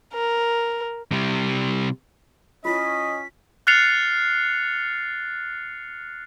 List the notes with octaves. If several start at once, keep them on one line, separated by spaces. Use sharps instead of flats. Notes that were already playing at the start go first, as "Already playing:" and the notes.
A#4
C3 G3
C#4 E4 F4 D#5 B6
F6 F#6 A6 C7 C#7 F7